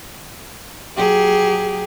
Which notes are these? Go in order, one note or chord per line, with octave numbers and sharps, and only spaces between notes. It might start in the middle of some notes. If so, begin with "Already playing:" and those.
F#3 G4 G#4